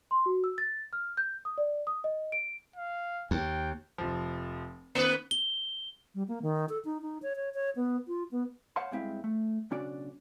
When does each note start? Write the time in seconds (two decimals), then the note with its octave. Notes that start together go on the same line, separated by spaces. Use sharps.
0.11 C6
0.26 F#4
0.44 E6
0.58 A6
0.93 F6
1.17 G6
1.45 D#6
1.58 D5
1.87 D#6
2.04 D#5
2.32 D7
2.76 F5
3.31 D#2 G5
3.98 F1 F3
4.95 D#3 A#3 B4 C#7 E7
5.31 G7
6.15 G3
6.28 A#3
6.42 D#3
6.69 A4
6.85 D#4
7.02 D#4
7.22 C#5
7.36 C#5
7.54 C#5
7.76 B3
8.08 F4
8.31 B3
8.76 C5 C#5 F5 F#5 A5 C6
8.91 G2 G#3 C4 E4 F5
9.24 A3
9.71 B1 C#3 C#4 D4 F#4 D5